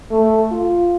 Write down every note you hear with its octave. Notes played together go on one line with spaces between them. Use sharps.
A3
F4